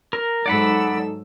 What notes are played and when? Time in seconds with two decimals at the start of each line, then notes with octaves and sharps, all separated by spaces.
0.13 A#4
0.46 G#2 F#3 D#4 A4 D5 F#5 B5 E6